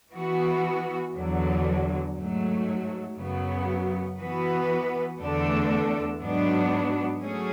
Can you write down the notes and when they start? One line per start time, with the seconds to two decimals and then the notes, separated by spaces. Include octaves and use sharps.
0.13 E3 B3 F#4
1.14 E2 D3 F#3
2.15 G#2 F#3 A3
3.16 F#2 C#3 F#3 B3
4.18 E3 B3 F#4 B4
5.19 E2 D3 A3 D4 A4
6.20 G#2 F#3 B3 D4
7.21 F#3 A3 C#4 G#4